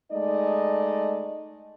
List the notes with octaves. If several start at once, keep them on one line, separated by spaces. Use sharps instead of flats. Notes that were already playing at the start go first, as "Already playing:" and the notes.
G#3 A3 D#4 D5 D#5